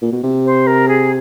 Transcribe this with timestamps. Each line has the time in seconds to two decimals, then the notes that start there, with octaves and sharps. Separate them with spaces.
0.02 A#2
0.12 B2
0.23 C3
0.45 C5
0.67 A#4
0.88 G#4